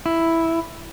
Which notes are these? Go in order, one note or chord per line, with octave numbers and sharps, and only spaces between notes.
E4